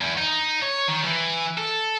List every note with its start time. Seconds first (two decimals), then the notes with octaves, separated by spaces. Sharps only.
0.01 E2
0.18 D#4
0.62 C#5
0.88 D#3
1.05 E3
1.58 A4